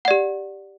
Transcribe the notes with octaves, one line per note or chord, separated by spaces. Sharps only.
G4 D5 F#5